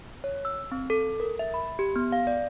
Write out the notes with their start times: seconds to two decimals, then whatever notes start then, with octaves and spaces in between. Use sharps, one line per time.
0.24 C#5
0.45 E6
0.72 C4
0.90 A4
1.20 A#4
1.39 E5
1.54 B5
1.79 G4
1.96 B3
2.12 F5
2.27 D5